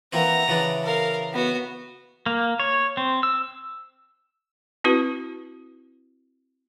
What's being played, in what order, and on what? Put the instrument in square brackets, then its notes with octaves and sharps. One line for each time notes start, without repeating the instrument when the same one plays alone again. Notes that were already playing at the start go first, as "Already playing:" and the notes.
[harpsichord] E3 A#3 C4 [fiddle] F#5 A#5
[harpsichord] C#3 E3 D4
[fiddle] A#4 F5
B3 F#4
[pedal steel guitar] A#3
C#5
C4
E6
[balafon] C4 E4 F#4 B4